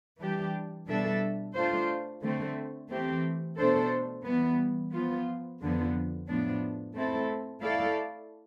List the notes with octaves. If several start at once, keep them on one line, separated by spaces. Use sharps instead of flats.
E3 G3 D4 G4
B2 G3 D4 A4 E5
A3 D4 F4 C5
D3 A3 C4
E3 A3 C4 G4
B2 A3 D4 A4 C5
E3 G3 B3
F3 B3 F4
F2 D3 F3 B3
A2 F3 B3 D4
A3 C4 E4 A4
A3 E4 A4 D5 F5